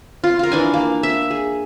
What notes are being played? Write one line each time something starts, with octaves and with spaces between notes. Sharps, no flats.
F4
F4 A#4
E3 D4 G#5
A#3
E5
G#4